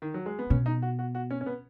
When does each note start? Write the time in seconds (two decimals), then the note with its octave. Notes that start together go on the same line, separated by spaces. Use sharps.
0.02 D#3
0.14 F#3
0.26 G#3
0.39 B3
0.50 B2 C#4
0.66 D#4
0.82 F#4
0.99 F#4
1.15 F#4
1.31 C#4
1.41 C#4
1.46 B3